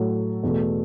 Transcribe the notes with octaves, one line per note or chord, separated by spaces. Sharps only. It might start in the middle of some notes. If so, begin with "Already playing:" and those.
Already playing: A2 F#3 A3 A4
E2 B2 A3